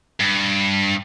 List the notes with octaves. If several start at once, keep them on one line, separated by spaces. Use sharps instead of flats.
G2